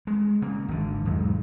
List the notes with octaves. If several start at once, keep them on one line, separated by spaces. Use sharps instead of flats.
G#3
C#3 A#3
G#1 D3
B1 E2 G#2 G#3